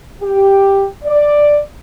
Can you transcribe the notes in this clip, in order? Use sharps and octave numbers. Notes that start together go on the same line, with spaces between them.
G4
D5